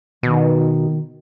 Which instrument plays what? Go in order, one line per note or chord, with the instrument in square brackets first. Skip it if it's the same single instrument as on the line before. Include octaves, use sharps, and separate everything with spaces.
[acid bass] B2 [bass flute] D#3